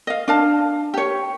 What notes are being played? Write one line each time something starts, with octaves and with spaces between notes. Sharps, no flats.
D#5 F5
D4 F5 A5
G4 C#5